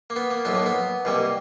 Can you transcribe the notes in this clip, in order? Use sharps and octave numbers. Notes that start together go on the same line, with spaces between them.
A#3
B3
A#3
B1 A2 F3 B3
A#3
B3
C2 B2 G3 A#3